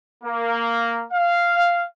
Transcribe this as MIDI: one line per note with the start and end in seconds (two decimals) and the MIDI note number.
0.24 1.04 58
1.13 1.83 77